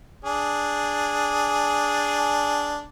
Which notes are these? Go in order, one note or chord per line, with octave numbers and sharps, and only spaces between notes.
D4 G#4